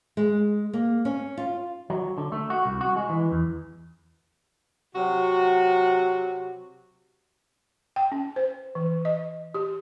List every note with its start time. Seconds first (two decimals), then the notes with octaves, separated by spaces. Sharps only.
0.17 G#3
0.73 A#3
1.05 C#4
1.38 F4
1.90 F#3
2.18 D3
2.32 A3
2.50 F#4
2.66 C2
2.81 F#4
2.96 G#3
3.09 E3
3.32 E2
4.95 C3 F#3 F#4
7.96 G5
8.12 C#4
8.36 C5
8.75 E3
9.05 D#5
9.54 G4